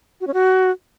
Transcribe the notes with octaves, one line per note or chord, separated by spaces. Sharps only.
F#4
C#4
F#4